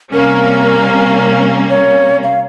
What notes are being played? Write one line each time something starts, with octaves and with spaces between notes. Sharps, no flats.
C3 G3 A#3 C#4 A#4
C#5
F5